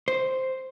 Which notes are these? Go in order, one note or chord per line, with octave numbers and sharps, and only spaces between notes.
C5